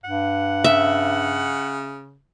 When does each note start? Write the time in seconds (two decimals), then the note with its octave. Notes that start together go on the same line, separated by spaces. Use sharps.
0.04 G2 F#5
0.64 C#3 E5